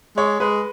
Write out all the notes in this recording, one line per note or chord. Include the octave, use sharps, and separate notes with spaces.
G#3 C#5
G#3 B4